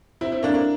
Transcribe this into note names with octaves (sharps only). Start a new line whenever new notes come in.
C4 E4
C4 E4
A#3 D4
A#3 D4